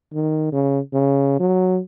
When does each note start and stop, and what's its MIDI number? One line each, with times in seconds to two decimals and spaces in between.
0.14 0.50 51
0.52 0.79 49
0.93 1.35 49
1.40 1.80 54